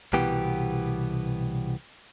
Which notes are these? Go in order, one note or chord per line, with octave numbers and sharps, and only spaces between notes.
C2 B2 E3 B3 G4